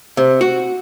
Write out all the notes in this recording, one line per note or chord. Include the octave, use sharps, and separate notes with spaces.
C3
F#4